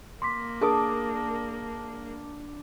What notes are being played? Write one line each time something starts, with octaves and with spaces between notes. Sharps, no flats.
A#3 C6 D6 B6
D4 G#4 A#4 D6 D#6